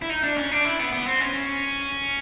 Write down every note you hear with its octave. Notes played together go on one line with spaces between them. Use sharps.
E4
D#4
D4
C#4
D4
E4
B3
B3
C4
C#4